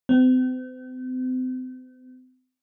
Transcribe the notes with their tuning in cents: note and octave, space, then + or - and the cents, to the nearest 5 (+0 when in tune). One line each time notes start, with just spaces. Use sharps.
C4 -40